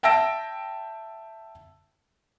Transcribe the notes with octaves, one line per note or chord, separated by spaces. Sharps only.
E5 G5 A5 E6 A#6 D7